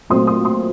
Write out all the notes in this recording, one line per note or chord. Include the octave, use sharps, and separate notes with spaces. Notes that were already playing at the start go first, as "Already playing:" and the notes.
A#2 F#3 A3 C4 C6 D#6
C6 D#6
C6 D#6